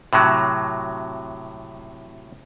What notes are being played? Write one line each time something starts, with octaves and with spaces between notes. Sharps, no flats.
A2 C3 F#3